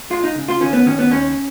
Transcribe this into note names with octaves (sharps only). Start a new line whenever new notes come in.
G#3 F4
D#4
C#3
F4
D#3 C#4
B3
D#3 C#4
B3
D#2 C#4